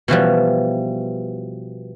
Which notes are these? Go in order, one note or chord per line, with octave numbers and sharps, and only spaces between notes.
B2 E3 F3 G3